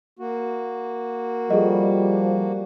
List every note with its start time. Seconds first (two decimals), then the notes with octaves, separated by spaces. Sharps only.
0.19 A#3 F#4
1.50 F3 G3 G#4 A4 D#5